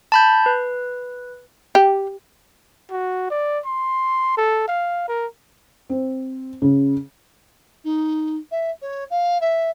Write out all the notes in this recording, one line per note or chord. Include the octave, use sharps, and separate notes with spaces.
A5 B5 G6
B4
G4
F#4
D5
C6
A4
F5
A#4
C4
C#3
D#4
E5
C#5
F5
E5